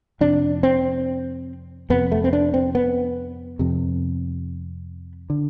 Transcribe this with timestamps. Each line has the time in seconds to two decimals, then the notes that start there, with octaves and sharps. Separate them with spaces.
0.21 F2 C3 D4
0.63 C4
1.90 F2 C3 B3
2.12 A3
2.24 C4
2.33 D4
2.54 C4
2.75 B3
3.59 F2 C3
5.30 D3